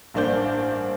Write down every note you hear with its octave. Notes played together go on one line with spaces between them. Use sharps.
A1 G2 A#3 D4 C5 G6